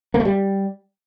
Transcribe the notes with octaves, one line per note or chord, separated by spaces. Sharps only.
A#3
A3
G3